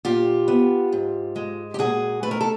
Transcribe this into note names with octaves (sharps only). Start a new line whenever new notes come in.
A#2 F4 G4
B3
G#2
G#3
G4
A#2 F#4 G#4
A3 B4
A#4
A4